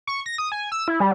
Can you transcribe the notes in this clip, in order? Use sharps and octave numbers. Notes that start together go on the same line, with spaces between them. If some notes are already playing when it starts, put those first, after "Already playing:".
C#6
A#6
D#6
G#5
E6
E4
G3